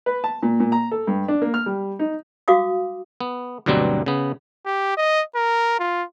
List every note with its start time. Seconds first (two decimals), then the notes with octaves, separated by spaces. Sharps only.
0.06 B4
0.24 A5
0.43 A#2
0.60 A#2
0.72 A#5
0.91 A4
1.07 G2
1.28 D4
1.42 A#3
1.54 F6
1.66 G3
1.99 D#4
2.48 F#4 F5 D6 D#6
3.21 B3
3.66 D2 G2 B2 F#3 G3 C4
4.06 C#3 B3
4.66 G4
4.97 D#5
5.35 A#4
5.79 F4